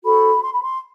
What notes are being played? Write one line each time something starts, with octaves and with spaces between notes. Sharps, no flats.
F#4 A4 C5 B5
C6
B5
C6